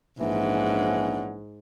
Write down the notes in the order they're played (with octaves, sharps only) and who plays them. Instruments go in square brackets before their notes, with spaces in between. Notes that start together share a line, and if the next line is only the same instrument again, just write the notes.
[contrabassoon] A#1 [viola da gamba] G#2 [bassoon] E3 [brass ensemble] C#4 D4 F#5